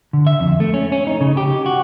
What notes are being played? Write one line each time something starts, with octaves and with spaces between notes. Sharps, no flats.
D3
E5
F2
A3
C#4
C#4
D#4
C#3
G4
F#4